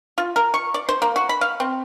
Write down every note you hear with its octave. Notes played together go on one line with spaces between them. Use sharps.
F4
A#4
C#6
D5
C5
A#3
F#4
B5
F5
C4